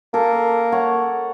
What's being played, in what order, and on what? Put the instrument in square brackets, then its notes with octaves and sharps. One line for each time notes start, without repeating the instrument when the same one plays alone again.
[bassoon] A#3 [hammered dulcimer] A4
[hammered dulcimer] C#5 F#5